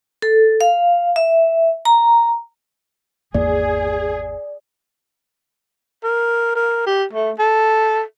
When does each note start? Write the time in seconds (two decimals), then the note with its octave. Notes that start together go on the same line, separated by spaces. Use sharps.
0.22 A4
0.61 F5
1.16 E5
1.85 A#5
3.35 G#1 E2 A#3 G#4 D5
6.04 A#4
6.56 A#4
6.86 G4
7.13 A3
7.39 A4